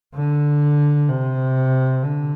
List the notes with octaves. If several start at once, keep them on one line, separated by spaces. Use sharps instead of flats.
D3
C3
D3